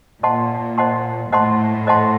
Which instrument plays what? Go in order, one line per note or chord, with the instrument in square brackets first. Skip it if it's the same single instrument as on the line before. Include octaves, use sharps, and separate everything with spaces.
[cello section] A#2 [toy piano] C5 D#5 F#5 A5 C6
[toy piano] C5 D#5 F#5 A5 C6
[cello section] A2 [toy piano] C5 D#5 F#5 A5 C6
[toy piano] C5 D#5 F#5 A5 C6